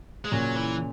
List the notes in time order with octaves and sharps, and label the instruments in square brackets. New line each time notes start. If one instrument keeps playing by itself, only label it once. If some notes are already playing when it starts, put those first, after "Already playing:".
[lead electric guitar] G#3
[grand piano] A#2 C#3 [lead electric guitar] F#3
[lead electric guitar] E3